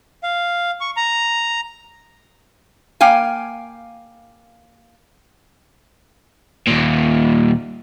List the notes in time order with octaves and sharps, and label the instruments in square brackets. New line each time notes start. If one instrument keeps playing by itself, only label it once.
[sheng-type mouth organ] F5
C#6
A#5
[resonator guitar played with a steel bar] A#3 F5 G5 G#5
[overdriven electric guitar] D#2 A#2